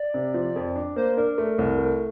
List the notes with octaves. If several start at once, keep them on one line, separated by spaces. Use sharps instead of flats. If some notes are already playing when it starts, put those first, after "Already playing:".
Already playing: D5
C3
F3
F2
D4
A#3 C5
D4 A#4
A3
C2
A3